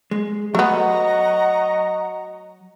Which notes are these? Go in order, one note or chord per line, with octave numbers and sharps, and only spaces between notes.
G#3
F#3 A3 B3 D#5 F#5 A#5 C#6